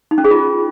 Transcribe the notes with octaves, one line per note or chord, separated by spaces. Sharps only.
D#4
C#4
G#4
F4